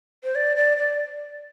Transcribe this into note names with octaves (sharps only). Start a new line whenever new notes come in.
C5
D5
D5
D5